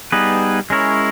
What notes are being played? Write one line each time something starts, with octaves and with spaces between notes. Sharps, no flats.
G3 B3 D#4 G#4 B4
G#3 C#4 E4 A#4 C#5